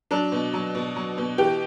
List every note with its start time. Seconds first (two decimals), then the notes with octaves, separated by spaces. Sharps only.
0.11 F#3 D4
0.32 B2
0.53 F#3
0.75 B2
0.96 F#3
1.18 B2
1.38 E3 G4